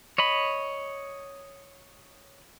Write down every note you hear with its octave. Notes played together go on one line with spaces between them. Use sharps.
C#5 D#5 B5